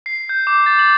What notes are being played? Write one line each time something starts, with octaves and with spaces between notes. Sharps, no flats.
C7
G6
D6
A6
F#7